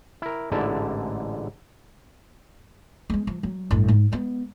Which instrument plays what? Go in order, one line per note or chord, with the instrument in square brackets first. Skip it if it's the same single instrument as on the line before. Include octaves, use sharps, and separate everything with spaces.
[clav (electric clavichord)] E4 A#4
A1 G#2 D3 E4 D5 A5
[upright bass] G#3 B3
F3
F#3
A1 G2
G#2
G#3 B3